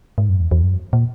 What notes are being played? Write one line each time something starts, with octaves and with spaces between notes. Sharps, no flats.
G#2
F#2
E2
E2
F#2
A#2